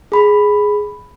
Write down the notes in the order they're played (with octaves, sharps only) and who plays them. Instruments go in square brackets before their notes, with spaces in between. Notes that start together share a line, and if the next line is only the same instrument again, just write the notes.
[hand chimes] G#4 B5